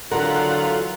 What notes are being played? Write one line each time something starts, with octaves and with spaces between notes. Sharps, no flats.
D3 E3 F#3 F4 A#4 F#5